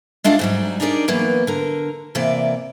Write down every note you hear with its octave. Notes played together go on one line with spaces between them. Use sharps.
G#3 A3 D4 F4 F5 F#5
G#2 F#3 G3
D4 D#4 G4 G#4 A#4 D5
E3 F#3 A#3 B3
D3 A#4
C3 E3 A#3 D5